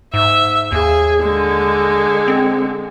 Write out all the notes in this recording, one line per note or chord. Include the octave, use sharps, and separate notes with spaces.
G#2 E5
D#2 G#4
D3 G#3
C4